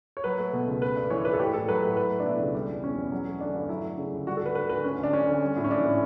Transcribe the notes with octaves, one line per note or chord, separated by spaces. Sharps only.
C#5
F#3 B4
A3
B2
C#2
A3 B4
G2
E3 C#5
G2 B4
A4
A3 G4
A2 A4
F#3 B4
A2
F#3 B4
A3
D4
B2 E4
C#2
G3
E2
B2 C#4
E2
F#3
A3
D3 D4
G2
F#3 E4
A3
C#3
D2
G3 F#4
A4
D2 B4
D3 B4
D2 B4
A3 C#4
D2
D4
D3 C#4
D2
G3
A2
C#4
E3 D4
A2